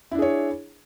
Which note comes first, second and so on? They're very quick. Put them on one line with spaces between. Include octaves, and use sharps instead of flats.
E4 D4 G#4 C#5